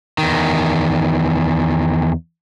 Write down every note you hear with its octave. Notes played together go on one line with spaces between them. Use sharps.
E2 D#3